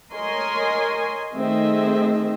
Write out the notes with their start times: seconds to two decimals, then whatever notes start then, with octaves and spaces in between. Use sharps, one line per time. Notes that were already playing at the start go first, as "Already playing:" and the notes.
0.13 A#4 C#5 D#5 G#5 C6
1.35 D#3 A3 C4 G#4 D#5 E5